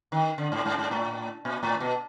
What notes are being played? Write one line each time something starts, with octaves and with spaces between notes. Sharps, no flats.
D#3
D3
G#2
G#2
G#2
A2
A#2
A2
B2